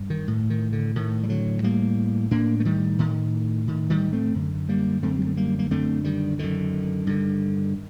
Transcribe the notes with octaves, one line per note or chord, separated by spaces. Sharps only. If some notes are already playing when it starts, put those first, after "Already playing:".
Already playing: G2
D#3
A2
D#3
D3
A2 D#3
G3
D3 F#3
A2 G3 A#3
A2 A#3 D4
A3
D#3 G3
A2 D#3
A2 D#3
D#3 G3
A3 C4
F#2 D3
G3 A#3
F#2 D3 A3 C4
G3
A3
G3 A#3
A#3
F#2 D3 A3 C4
D#3 G3
F#2 D3 D#3
G2 D3